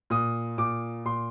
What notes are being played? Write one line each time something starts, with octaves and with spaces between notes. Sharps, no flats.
A#2 D#6
A#2 D6
A#2 C6